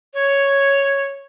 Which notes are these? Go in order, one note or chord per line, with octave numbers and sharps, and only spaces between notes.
C#5